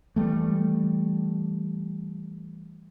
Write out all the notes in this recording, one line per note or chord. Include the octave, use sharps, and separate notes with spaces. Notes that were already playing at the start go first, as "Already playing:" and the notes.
E3 G3 A3